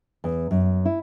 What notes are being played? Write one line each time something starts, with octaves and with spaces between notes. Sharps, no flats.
E2
F#2
E4